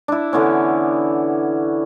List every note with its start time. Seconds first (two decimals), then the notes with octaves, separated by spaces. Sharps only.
0.08 D4 E4
0.33 D3 E3 B3 C#4